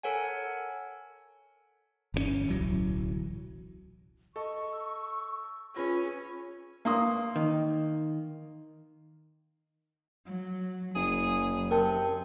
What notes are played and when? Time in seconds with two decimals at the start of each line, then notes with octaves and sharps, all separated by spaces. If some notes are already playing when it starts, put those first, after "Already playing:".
0.03 A4 A#4 C#5 F#5 G#5
2.14 G1 C#3 C#4
2.48 D1 B1 E3 F#3
4.36 A4 D#5 C#6
4.73 E6
5.76 C#4 F4 G#4 B4 B5 A#6
6.85 A#3 C6 D#6
7.36 D#3
10.25 F#3
10.95 F#1 F#2 G#4
11.71 C3 A#4 G5 A5